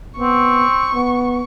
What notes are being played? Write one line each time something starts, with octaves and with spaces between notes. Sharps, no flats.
B3 C4 C#6
B3